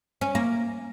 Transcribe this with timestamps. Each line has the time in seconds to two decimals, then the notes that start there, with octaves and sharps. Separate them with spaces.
0.21 C#4
0.35 A#3